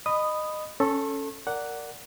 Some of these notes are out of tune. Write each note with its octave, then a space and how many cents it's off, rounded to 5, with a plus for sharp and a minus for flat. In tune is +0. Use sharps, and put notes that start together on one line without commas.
D#5 -20 B5 +10 D#6 -5
C#4 +0 A4 +0 C#6 -40
A#4 -10 D5 -10 F#5 +0